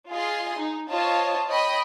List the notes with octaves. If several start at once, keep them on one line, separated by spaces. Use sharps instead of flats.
F4 G#4 D#5 C6
D#4
F4 C5 C#5 D#5 A5
C#5 D#5 G5 B5